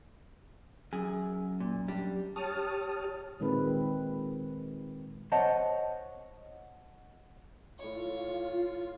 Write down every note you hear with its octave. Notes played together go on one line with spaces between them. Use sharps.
F#2 G#4
A#2
G3 D4
G4 C#5 A5 D#6 F6
A#2 D#3 G#3 C4 B4
C5 C#5 D#5 F#5 A5
A2 F4 C#5 D6